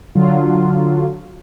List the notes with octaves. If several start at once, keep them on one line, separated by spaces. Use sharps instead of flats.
D3 F#3 F4